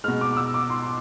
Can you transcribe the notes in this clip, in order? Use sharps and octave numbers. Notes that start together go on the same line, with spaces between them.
B2 G#3 F6
D6
D6
E6
D6
C6